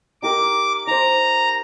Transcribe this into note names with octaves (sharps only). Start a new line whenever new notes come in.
D#4 G4 A#4 D6
D#4 C5 A#5